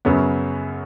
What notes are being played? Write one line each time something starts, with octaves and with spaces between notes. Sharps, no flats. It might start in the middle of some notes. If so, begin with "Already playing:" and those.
F#2 C#3 F#3 B3